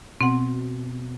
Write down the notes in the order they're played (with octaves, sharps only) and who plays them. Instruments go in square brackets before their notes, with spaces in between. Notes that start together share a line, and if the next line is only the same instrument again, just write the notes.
[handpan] B2 [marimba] C4 F#5